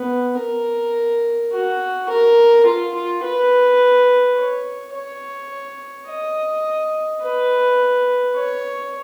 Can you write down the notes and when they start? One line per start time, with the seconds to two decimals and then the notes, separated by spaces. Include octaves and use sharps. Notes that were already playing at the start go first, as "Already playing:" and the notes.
Already playing: B3
0.39 A#4
1.52 F#4
2.09 A#4
2.66 F4
2.94 F4
3.23 B4
4.38 C#5
4.94 C#5
6.08 D#5
7.22 B4
8.36 C#5